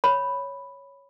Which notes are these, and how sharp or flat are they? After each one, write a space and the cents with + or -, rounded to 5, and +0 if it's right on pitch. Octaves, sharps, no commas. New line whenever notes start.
C#5 +0 B5 +0